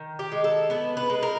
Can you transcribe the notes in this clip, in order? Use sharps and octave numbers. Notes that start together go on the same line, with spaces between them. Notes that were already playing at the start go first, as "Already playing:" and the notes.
Already playing: D#3
G4
G#3
A4
B3 B4
B4
G#3
A#4